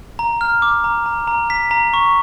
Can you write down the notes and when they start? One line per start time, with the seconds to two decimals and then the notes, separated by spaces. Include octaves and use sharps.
0.19 A#5
0.41 F6
0.62 D6
0.84 A#5
1.06 A#5
1.28 A#5
1.50 B6
1.71 A#5
1.94 C#6